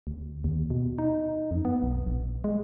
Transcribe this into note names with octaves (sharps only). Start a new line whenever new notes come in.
D2
D#2
B2
D#4
F2
B3
B1
A#1
G#3